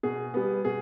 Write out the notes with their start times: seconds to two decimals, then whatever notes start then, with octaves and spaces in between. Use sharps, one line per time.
0.03 B2 G#4
0.34 G3 B3
0.65 B2 G#4